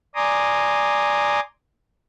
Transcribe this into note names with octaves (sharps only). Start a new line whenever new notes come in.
D5 G#5 A#5 C6 D6 D#6